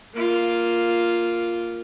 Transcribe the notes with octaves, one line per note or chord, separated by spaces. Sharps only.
A#3 F4